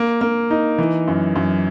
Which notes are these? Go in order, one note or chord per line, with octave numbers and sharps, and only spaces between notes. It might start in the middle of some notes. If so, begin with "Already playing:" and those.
Already playing: A#3
A#3
D#4
E3
F#2
F#2